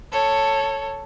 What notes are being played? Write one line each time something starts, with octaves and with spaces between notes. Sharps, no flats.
A4 C#5